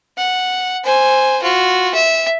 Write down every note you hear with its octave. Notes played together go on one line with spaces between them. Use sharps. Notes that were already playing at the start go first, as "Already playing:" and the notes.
F#5
C5 G#5
F4 F#4
E5